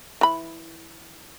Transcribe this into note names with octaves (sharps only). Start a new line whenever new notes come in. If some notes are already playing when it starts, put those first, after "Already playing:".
E3 B5